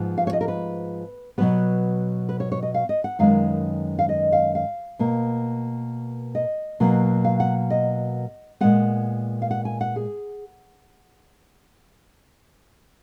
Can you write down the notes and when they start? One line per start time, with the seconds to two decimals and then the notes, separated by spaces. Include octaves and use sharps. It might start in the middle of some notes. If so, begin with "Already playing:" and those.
Already playing: G#2 F3 B3
0.18 F5
0.27 C#5
0.33 D#5
0.41 A#4
0.48 B4
1.38 B2 F#3 B3 B4
2.29 B4
2.40 C#5
2.52 C#5
2.62 D#5
2.74 F5
2.89 D#5
3.04 F#5
3.19 F#2 D#3 G#3 B3 F5
3.99 F5
4.09 D#5
4.32 F5
4.55 F5
4.99 B2 A#3
6.35 D#5
6.80 B2 F#3 A#3
7.25 F5
7.40 F#5
7.70 D#5
8.61 A#2 G#3 B3 F#5
9.42 F5
9.51 F#5
9.65 G#5
9.81 F#5
9.96 G#4